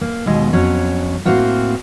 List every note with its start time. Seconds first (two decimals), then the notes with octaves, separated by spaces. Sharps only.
0.01 A#3
0.26 D#2 B2 G#3
0.53 F2 F#3 C#4
1.25 A2 A#3 C4 F#4 F5